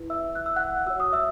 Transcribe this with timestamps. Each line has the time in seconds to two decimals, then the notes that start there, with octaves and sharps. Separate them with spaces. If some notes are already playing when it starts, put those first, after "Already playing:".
Already playing: E4 B4
0.10 E5 E6
0.35 F#6
0.46 E6
0.56 F#5 F#6
0.86 F#4 C#5 E6
1.00 D#6
1.13 E5 E6